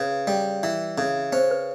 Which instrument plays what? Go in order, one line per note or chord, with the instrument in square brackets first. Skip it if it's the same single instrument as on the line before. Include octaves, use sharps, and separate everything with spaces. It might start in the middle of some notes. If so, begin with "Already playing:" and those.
Already playing: [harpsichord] C#3 [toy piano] B4
[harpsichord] G3
E3
C#3
[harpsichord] C#4 [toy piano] C5
[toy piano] B4